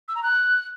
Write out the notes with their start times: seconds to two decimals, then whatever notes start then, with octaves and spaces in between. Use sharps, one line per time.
0.08 E6
0.16 A#5
0.23 F#6